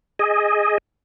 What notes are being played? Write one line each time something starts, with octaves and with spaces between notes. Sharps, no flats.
G#4 D#5